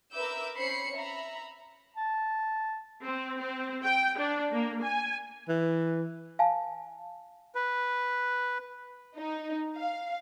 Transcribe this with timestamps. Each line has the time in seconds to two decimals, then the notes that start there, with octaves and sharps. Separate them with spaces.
0.12 A#4 B4 E5 D6 E6 G6
0.56 C4 C#4 C5 B5 C7 C#7
0.95 E5 A#5 B5
1.97 A5
3.04 C4
3.39 C4
3.84 G5
4.19 D4
4.52 A#3
4.84 G#5
5.49 E3
6.39 F5 G#5 A5
7.55 B4
9.17 D#4
9.76 F5